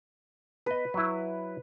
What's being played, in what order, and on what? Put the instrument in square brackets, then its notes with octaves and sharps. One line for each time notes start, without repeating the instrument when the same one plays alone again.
[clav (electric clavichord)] B3 D#5 [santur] B4
[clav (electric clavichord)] F#3 E4